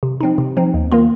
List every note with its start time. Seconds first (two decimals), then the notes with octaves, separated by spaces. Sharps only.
0.03 C3
0.21 F3 C4 D#4
0.38 C3
0.57 F3 C4 D#4
0.74 D#2
0.92 D#3 A#3 F4